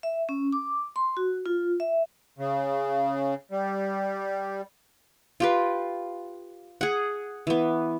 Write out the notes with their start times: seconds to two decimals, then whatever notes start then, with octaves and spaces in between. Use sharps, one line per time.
0.03 E5
0.29 C#4
0.53 D6
0.96 C6
1.17 F#4
1.46 F4
1.80 E5
2.39 C#3
3.51 G3
5.40 F4 G4 B4
6.81 G#4 F#5
7.47 E3 B3